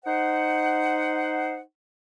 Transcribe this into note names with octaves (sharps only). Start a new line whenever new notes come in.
D#4 C5 F#5